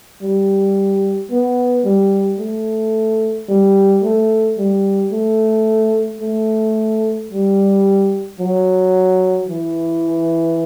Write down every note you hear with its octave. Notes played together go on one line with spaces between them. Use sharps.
G3
B3
G3
A3
G3
A3
G3
A3
A3
G3
F#3
E3